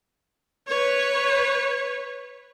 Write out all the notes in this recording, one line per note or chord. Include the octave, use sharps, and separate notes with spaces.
B4 C#5